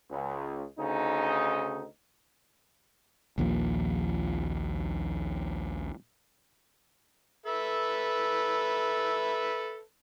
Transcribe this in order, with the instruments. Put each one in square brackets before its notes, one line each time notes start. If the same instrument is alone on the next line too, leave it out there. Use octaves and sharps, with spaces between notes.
[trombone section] C#2
D2 C#3 D#4
[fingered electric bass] A#1 D#2 A#2 F3
[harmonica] A4 B4 E5